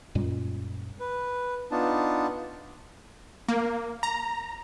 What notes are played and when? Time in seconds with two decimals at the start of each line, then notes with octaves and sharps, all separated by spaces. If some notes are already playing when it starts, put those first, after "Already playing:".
0.15 F#2 A#2 G3 G#3
1.00 B4
1.71 B3 D4 D#4 F4 A5
3.48 A#3
4.03 A#5